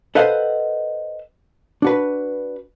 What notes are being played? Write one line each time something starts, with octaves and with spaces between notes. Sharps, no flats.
A4 B4 C5 D#5 F5 F#5
D4 F#4 B4